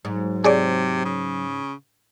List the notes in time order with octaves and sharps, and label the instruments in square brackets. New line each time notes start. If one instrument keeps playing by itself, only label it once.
[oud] G#2 [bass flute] F#3
[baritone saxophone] C3 [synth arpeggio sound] G#4 C#5 D5
[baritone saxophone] C#3